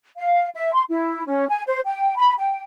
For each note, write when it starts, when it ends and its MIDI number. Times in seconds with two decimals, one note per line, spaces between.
0.17 0.48 77
0.55 0.73 76
0.74 0.83 84
0.89 1.26 64
1.27 1.45 61
1.48 1.62 80
1.67 1.78 72
1.85 2.16 79
2.17 2.33 83
2.39 2.62 79